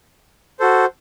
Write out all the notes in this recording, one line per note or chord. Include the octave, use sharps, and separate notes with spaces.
F#4 A4 C5